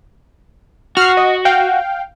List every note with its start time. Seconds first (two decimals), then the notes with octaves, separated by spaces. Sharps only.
0.97 F#4 F6 C7
1.17 D#5
1.45 F5 G5